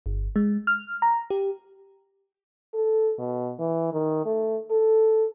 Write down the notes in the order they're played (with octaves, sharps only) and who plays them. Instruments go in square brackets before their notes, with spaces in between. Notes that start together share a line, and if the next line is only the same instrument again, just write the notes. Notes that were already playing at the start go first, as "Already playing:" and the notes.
[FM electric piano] G1
G#3
F6
A#5
G4
[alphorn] A4
B2
E3
D#3
A3
A4